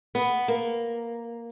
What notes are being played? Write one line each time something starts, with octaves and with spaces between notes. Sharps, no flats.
B3
A#3